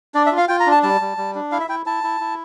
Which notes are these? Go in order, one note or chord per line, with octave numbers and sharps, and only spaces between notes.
D4 D5
E5
F4
F5
F4 G5
A#5
D4
A5
G3 A5
G3
G3
D4
E4 F5
E5
E4 G5
E4 A5
E4
E4